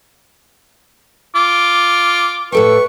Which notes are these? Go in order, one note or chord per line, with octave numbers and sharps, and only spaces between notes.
F4 D6
A2 A4 B4 G5 C#6